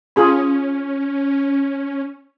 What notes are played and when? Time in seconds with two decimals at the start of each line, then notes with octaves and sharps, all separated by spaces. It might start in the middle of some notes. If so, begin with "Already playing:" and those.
0.16 C#4 F4 G#4 B5